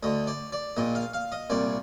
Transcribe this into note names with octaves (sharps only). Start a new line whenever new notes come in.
D2 D3 D#5
D5
D5
A#1 A#2 D#5
F5
F5
D#5
C2 A#2 D5